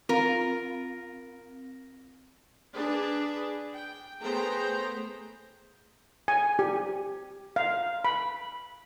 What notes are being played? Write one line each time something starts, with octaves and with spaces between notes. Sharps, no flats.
C4 F4 A#4
D4 G#4 B4
G5
A3 B3 G#4 C5 G5 A#5
G#5
G4
F5
B5